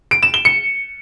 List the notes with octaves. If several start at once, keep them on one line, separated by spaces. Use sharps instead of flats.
D7
E7
G7
C#7